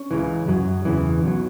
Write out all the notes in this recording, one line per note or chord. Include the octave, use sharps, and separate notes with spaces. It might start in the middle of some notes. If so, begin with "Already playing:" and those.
Already playing: C#4
C#2 C#3 E3
F#2 F#3
E2 C#3 E3
B1 B2 F#3